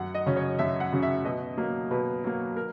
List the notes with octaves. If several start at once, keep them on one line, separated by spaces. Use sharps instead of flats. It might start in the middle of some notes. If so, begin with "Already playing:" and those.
Already playing: F#2 F#5
D#5
C#3 F#3 C#4
C#5
F#2 E5
F#5
C#3 F#3 C#4
E5
B2 D#5
F#3 A#3
B2 B4
F#3 A#3
A#4